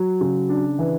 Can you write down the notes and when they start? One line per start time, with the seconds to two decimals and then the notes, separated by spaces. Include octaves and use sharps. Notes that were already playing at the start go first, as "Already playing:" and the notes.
Already playing: F#3
0.21 C#3
0.49 D4
0.78 E3